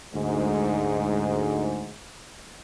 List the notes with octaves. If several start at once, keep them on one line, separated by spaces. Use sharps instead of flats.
D2 G#2